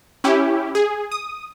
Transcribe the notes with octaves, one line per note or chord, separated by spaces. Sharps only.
C#4 E4 G4
G#4
D#6